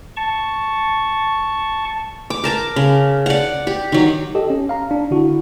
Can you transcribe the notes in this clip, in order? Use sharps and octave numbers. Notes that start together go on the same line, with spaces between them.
A5 C#6
D6
A#4 A5 D6
C#3
D5 F#5
G4
D#3 F#3
G4 A4 D#5
C#4
F5 A#5
D4
D3 E4 F#4